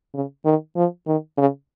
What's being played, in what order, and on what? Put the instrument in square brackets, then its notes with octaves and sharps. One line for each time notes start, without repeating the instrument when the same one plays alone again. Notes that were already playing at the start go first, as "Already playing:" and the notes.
[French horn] C#3
D#3
F3
D#3
C#3